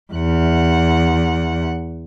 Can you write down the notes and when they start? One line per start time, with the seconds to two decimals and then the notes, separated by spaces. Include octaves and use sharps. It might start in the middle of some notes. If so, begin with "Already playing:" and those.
0.13 E2 F#5